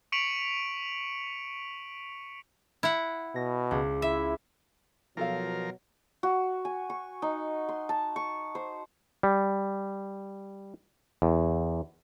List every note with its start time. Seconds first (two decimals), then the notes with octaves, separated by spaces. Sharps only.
0.12 C#6 B6 C#7 D7 F7 F#7
2.83 E4 F#5
3.36 B2 A#6
3.71 C#2
4.02 E4 E5
5.17 B2 F3 F#3 F4 A4 A#4 F5
6.23 F#4
6.65 G#5
6.90 C#6
7.22 D#4
7.69 C6
7.89 A5
8.16 C#6
8.55 C5
9.23 G3
11.22 E2